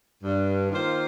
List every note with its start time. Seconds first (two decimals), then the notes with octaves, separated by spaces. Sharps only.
0.23 G2
0.69 D#3 A#3 F4 C5